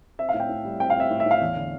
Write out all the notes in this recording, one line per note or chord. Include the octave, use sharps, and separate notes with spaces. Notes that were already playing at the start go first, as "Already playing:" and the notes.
C4 E5
F5
A2
G5
A2
G3
C4 G5
F5
C4
E5
A2
E5
A2
F5
E2
D3